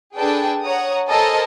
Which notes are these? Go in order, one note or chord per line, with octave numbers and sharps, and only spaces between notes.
D4 G#4 A4 B4 G5 A5
C#5 F#5 A#5 D#6
A4 A#4 C5 D#5 G#5 A5